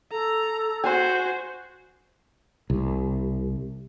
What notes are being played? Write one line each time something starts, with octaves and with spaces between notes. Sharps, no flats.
A4 A#5
F#4 C5 G#5 C6
C2